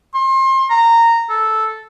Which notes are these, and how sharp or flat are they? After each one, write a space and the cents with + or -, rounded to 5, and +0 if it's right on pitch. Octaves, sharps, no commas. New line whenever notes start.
C6 +30
A#5 -15
A4 -5